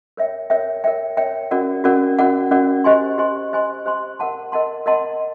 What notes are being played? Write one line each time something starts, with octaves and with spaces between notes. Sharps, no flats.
A#4 C#5 E5 G5
A#4 C#5 E5 G5
A#4 C#5 E5 G5
A#4 C#5 E5 G5
C#4 F#4 A#4 D5 F#5
C#4 F#4 A#4 D5 F#5
C#4 F#4 A#4 D5 F#5
C#4 F#4 A#4 D5 F#5
G4 C5 D#5 G#5 C6
G4 C5 D#5 G#5 C6
G4 C5 D#5 G#5 C6
G4 C5 D#5 G#5 C6
A#4 D#5 F#5 A5 C6
A#4 D#5 F#5 A5 C6
A#4 D#5 F#5 A5 C6